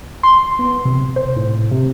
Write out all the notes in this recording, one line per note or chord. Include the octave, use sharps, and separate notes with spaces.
C6
B3
C3
C5
A2
C3